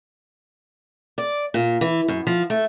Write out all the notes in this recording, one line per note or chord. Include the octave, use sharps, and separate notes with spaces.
D5
A#2
E3
F#2
F3
A3